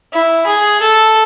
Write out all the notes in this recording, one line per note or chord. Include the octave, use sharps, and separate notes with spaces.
E4
G#4
A4